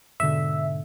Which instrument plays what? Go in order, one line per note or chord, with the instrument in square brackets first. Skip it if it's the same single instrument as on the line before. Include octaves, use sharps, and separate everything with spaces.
[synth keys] G#2 B2 D3 [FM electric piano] E5